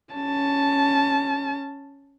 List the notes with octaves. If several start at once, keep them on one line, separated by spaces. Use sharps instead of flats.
C#4 A5